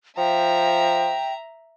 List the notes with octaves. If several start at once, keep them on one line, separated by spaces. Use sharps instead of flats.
F3 E5 G5 A#5